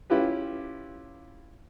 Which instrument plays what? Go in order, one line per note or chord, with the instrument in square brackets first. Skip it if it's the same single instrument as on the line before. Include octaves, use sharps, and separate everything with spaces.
[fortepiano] C#4 E4 F4 G4 B4